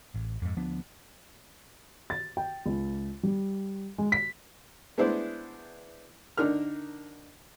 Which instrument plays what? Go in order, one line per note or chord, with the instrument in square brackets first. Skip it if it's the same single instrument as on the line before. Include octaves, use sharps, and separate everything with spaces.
[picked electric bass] A1
F2 G#2
D2 F3 B3 D4
[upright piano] A6
G5
C#2
G3
G#3
B6
[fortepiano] G#3 B3 D4 E4 C5 D5
D3 D4 D#4 A#4 F6